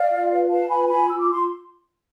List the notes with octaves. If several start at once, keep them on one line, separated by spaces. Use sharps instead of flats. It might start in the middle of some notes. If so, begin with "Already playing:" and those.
Already playing: D5 F5
F4
B4
B4 F5 A5
F4 G#5 B5
F4 G#5 B5
F4 E6
D6
F4 C6